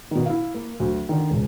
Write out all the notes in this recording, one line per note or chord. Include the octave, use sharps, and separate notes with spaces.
B2 D#3
E4 F5
A#3
D2 F#3
D3 D#3
E1 C#2